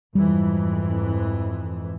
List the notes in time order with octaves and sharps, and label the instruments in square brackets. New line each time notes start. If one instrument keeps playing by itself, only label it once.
[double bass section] F2 G#2 E3 [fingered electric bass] G3